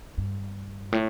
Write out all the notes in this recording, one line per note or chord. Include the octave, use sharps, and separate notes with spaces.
G2
A2